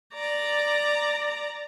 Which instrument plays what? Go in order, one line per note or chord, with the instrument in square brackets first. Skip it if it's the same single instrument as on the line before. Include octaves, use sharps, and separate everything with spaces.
[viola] D5 A#5